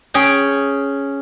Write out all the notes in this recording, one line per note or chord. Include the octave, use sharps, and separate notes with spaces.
C#4 G#4 G5